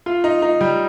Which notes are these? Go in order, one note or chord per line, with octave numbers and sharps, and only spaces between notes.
F4
D#4
D#4
G3